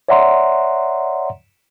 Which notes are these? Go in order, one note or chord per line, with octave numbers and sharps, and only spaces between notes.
C#5 D5 E5 F#5 A#5 C6